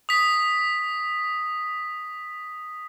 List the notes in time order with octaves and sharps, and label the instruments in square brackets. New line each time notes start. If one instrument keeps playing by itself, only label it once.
[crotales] D#6 B6